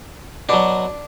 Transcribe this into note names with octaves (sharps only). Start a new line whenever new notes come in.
B2 F#3 D4